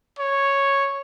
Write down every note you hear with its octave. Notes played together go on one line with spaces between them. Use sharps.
C#5